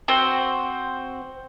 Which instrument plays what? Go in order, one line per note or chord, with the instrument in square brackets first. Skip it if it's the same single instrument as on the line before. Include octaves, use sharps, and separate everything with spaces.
[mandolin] C4 F#4 C5